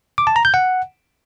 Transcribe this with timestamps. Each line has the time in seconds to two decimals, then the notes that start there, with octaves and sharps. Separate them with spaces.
0.18 D6
0.27 A5
0.36 A#5
0.45 G6
0.54 F#5